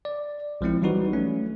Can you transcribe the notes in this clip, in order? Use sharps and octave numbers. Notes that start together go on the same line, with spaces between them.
D5
A#1 F3 G#3 C4 E4
E3 F#3 G3 D#4 F#4 B4
A3 C#4